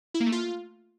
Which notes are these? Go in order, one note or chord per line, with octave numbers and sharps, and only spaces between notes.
E4
A#3
A3
F4